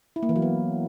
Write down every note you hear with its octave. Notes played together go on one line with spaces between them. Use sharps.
E4
A#3
E3
F#3
B3